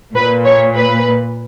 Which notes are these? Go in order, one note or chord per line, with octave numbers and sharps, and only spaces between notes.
A#2 B4
C#5
B4